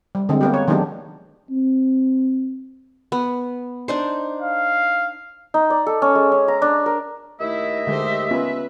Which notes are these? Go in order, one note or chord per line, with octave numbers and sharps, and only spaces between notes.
G3
D3 G#3 C4
A#3 B3 G4
C#5
D#3 F#3 G#3 B3 D4 G4
C4
B3
D4 D#4 C5
F5
D#4
D5
A4
C#4
G#3
C#4
A#5
D4
A#4
D#2 A3 E4 D#5 E5
D3 G#3 G4 A4 C5
B3 C#4 F4 B4